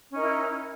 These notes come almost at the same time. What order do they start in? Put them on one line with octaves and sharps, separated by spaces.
C#4 D#4 A#4 E4